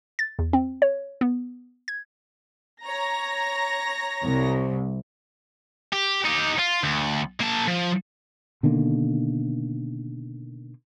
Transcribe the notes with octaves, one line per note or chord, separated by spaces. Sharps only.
A6
E2
C4
C#5
B3
G#6
C#5 A#5 A#6
C2
G4
D#4 G4
F4
D2
A#3 A5
F3
B2 D3 D#3 A#3